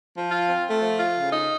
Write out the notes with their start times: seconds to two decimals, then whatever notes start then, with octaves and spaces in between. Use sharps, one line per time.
0.14 F3
0.31 F4
0.48 C4
0.65 A3
0.82 F3
0.99 F4
1.16 C#3
1.33 D#4